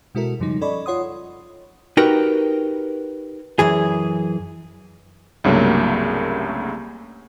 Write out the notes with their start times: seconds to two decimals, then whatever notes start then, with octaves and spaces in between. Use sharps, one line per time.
0.15 B2 G#3 E4 F#4 A4 A#4
0.40 F#2 C#3 F3 G3 D#4
0.61 C#4 A4 D5 D#5 B5 C#6
0.86 F4 C#5 F#5 C6 D#6
1.97 D#4 F#4 G4 A#4 B4
3.59 F#2 E3 G#4
5.44 C2 G2 C#3 F#3 A3 A#3